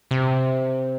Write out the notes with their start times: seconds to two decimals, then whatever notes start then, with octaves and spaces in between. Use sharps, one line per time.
0.11 C3